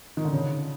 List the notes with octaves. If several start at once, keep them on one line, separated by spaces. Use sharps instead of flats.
D#3
D3
C#3